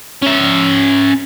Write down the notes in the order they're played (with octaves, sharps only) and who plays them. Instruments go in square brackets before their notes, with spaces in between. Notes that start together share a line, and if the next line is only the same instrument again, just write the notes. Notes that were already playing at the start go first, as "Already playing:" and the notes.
[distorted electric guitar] C#4 E5